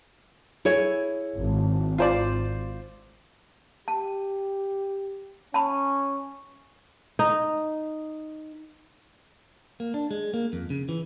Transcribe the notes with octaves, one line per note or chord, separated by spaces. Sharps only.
E4 G#4 C#5
G#1
F4 C5 D5
G4 A5
C#4 A5 B5
D#4
A#3
D4
G#3
A#3
F2
C#3
E3